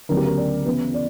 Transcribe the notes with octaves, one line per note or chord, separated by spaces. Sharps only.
D2 C#3 F#3 B3 A#4
G4
A#4
D5
C#3 E3 B3 E4 B4
D5